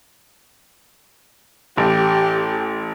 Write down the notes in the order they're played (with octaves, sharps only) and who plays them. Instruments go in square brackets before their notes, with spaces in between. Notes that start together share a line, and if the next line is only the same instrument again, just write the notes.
[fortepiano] A1 [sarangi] G4